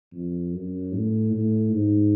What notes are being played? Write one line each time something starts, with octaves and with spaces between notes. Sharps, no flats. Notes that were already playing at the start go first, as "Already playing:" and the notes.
F2
F#2
A2
A2
G#2